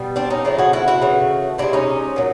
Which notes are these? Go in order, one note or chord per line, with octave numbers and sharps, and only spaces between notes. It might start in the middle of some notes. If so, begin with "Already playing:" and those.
Already playing: B2 G3
C4 D4
C#4 D#4
C#3 F3 A3 D4 E4
F#4 G#4
E4 F#4
E4 F#4
C#3 E3 A3
C3 E3 G#3 D4 E4
C#4 D#4
A#2 F#3